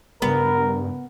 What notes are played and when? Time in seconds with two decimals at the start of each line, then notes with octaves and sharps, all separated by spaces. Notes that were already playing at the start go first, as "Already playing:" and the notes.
0.22 G2 C#3 B3 A#4